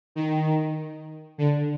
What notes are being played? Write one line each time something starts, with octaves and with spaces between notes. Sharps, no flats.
D#3
D3